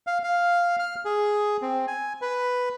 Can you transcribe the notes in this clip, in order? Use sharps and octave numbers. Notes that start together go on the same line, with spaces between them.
F5
F5
F6
G#4
C4
G#5
B4